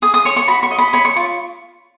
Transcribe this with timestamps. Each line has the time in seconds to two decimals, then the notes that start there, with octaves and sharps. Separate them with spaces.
0.02 G#4 D#6
0.14 D#6
0.25 C#5 C#6
0.36 C#6
0.48 F#4 B5
0.63 C#6
0.71 D#5
0.78 B5
0.93 C#5 B5
1.05 C#6
1.16 F4 C#6